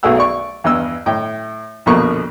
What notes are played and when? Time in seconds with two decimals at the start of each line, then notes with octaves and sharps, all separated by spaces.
0.03 B1 F#3 A3 G#4 F#5 E6
0.17 D5 C#6
0.64 E2 G2 D#5 E6
1.06 A2 G5
1.86 A#1 F2 B2 D3 A#3 C#6